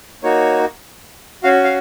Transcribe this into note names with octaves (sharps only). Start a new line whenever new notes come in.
A#3 D#4 F#4 C#5
C#4 F#4 F5
F5